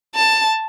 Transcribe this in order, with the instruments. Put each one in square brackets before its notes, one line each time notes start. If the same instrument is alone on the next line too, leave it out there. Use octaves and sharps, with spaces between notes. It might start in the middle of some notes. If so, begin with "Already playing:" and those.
[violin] A5